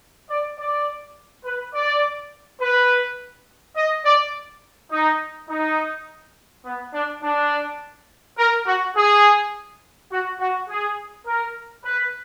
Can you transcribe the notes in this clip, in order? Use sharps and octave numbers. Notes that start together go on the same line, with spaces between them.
D5
D5
B4
D5
B4
D#5
D5
D#4
D#4
B3
D4
D4
A#4
F#4
G#4
F#4
F#4
G#4
A#4
B4